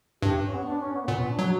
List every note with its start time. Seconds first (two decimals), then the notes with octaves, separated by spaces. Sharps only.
0.22 G2 G4
0.44 C#4
0.54 B3
0.65 D4
0.79 C#4
0.94 B3
1.03 A#3
1.08 A#2 B3
1.19 C#4
1.29 D4
1.39 F#3 F#4